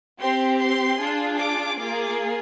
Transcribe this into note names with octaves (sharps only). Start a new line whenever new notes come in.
C4 G4 C6
C6
D4 F4 G#4
D6
A#3 F4 G#4 D6